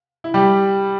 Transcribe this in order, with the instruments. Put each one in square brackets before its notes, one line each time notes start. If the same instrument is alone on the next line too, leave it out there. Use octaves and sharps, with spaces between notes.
[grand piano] E4
G3 G4